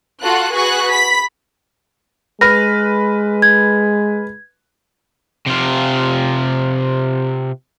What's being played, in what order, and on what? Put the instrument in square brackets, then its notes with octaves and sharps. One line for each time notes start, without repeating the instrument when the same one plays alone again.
[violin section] F4 F#4 A4 F#6
F#4 G#4 B4 C#6 F#6
B5 B6
[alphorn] G#3 [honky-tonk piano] B4 F6 [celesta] A#6
[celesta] G#6
[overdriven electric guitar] C3 F4